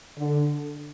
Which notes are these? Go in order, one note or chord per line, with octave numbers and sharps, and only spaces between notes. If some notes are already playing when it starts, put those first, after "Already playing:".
D3